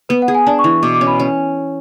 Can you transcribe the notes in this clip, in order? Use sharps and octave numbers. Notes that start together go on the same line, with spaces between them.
B3 B4
F#5
G#4
G#5
D4 A5
C#6
E3
C#6
B2 D6
D6
C#4
B5
C#4